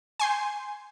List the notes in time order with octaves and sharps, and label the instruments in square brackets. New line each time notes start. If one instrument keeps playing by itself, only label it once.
[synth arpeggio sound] G#5 C6 G6